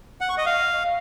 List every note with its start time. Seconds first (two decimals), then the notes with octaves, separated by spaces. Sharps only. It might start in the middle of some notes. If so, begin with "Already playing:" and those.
0.21 F#5
0.29 C#6
0.38 D#5
0.46 F5